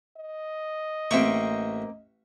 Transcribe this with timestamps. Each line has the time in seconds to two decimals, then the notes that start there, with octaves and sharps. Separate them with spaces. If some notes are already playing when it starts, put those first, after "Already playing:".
0.17 D#5
1.11 A1 A#3 C4 E5 C#6